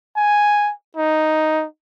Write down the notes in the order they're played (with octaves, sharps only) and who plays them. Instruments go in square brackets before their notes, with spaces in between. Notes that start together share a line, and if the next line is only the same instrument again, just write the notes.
[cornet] G#5
D#4